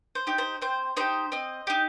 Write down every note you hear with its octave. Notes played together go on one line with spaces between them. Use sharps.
C5
D#4 G4
C5
C4 C5
D#4 G4 C5
C4 D#5
D#4 G4